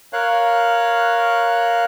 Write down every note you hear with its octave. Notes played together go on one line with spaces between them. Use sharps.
A#4 C#5 F5 F#6